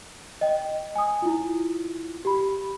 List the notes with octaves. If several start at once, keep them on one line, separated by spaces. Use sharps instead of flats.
D#5 G5
G#5 D#6
E4 F4
G4 B5